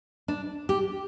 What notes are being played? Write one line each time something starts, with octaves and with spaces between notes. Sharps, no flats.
D4
G4